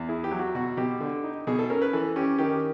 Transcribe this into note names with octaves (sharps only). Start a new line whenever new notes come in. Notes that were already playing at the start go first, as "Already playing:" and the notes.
Already playing: E2
E4 G#4
G4
F#3
F#4
B2 F#4
B2 G4
D3
D#4
B2 G#4
A4
C#4 A#4
B4
E3 A4
C#4 G4
D#3 G4